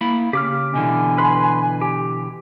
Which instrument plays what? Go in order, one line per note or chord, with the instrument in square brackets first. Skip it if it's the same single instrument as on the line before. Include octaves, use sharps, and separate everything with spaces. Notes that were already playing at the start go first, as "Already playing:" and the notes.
[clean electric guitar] A#3 E4 B5
[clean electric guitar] C#3 [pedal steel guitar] G4 D6 F6
[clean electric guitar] B2 D3 E3 [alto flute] G#5
[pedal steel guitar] B4 B5 C6
G4